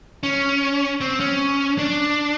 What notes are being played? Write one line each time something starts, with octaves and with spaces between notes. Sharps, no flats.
C#4
C4
C#4
D4